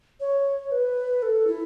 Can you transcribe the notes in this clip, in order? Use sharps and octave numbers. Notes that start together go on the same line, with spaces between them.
C#5
B4
A4
E4